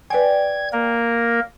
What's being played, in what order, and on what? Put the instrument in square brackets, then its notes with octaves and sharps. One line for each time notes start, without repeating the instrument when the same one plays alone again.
[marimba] B4 G#5 [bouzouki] D5 G5 [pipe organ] G#6
[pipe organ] A#3 A#4